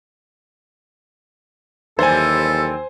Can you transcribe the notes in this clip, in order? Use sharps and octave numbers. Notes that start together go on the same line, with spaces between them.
D#2 E3 F#3 G3 A4 C5 G#5